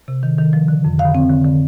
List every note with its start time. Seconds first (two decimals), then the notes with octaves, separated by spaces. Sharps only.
0.08 C3
0.23 D#3
0.39 D#3
0.53 F3
0.68 D3
0.85 F2
0.99 D3 F5
1.15 C4
1.30 D3
1.45 D3